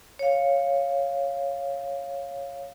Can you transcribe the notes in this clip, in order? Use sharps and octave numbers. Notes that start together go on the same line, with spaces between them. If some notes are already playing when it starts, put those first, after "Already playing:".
C#5 F5